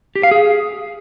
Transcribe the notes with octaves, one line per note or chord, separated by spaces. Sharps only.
G4
F5
G#4